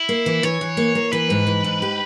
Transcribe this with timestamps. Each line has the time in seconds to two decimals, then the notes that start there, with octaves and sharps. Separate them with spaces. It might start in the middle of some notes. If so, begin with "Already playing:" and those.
Already playing: E4
0.09 A#3
0.26 E3
0.43 E3 C#5
0.61 E3
0.77 A#3
0.95 A#3
1.12 E3 B4
1.30 G#2
1.47 E3
1.64 G#2
1.82 G4